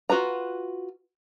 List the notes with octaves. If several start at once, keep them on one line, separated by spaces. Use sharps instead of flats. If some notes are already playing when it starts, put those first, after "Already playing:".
F4 F#4 B4 A#5